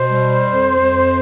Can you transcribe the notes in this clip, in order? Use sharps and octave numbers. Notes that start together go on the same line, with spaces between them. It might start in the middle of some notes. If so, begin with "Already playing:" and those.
Already playing: B2 C5
G3
F2
F2